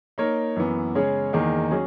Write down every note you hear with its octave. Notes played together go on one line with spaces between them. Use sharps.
A#3 D#4 A#4 C#5
F#2 E3 B3
C#3 G#3 C#4 G#4 C#5
E2 D#3 A#3 D#4 G#4
F#3 C#4 G#4